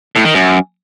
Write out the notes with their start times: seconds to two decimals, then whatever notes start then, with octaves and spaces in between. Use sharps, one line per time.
0.16 A2
0.25 D#3
0.34 F#2